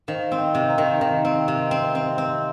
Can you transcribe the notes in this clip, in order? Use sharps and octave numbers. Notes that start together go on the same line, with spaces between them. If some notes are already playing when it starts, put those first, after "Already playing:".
D#3 C5 F5
C4
D#5 G5
C3
F5 A#5
D#3
D#3
C4
C3
C4
C4
C4